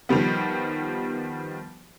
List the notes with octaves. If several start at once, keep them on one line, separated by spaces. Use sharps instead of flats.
D#3 F3 G3 B3